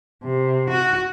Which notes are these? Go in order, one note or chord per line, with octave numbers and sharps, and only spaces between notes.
C3
F#4